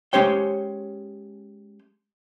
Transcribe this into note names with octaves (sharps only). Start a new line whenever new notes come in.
G#3 C#4 G4 C5 C#5 G5